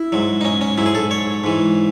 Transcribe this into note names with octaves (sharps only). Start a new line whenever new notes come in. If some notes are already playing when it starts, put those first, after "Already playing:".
Already playing: E4
G#2 F#3
D#4
C#4
C#4
G#2 F#3 E4
G#4
A4
C#5
G#2 E3